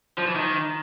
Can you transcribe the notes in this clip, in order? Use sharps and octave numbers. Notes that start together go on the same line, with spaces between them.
F3
E3
D#3